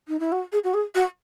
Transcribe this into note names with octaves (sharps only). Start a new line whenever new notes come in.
D#4
E4
F#4
G#4
F#4
G#4
F#4